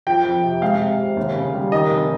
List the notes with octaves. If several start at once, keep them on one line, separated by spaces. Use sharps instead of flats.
F3 G5
F2
C3
G#3 F5
C3
C3
D#2
C#3
G3
D#3 D#5
F1